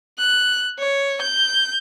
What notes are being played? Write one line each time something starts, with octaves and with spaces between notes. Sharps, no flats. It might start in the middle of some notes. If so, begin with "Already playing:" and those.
F#6
C#5
G6